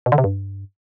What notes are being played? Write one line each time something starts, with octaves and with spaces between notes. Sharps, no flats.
B2
D3
C3
G2